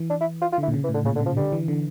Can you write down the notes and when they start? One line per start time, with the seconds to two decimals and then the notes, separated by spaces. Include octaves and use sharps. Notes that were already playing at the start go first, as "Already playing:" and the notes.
Already playing: E3
0.10 D4
0.21 E4
0.41 F4
0.52 F4
0.58 D3 E4
0.68 A#2
0.74 C#3
0.84 E3
0.89 A2
0.94 D3
1.05 A#2 C#3
1.16 D3
1.20 C#3
1.26 F3
1.36 D3 G3
1.52 E3
1.68 D3